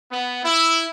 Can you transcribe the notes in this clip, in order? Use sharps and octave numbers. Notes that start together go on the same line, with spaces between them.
B3
E4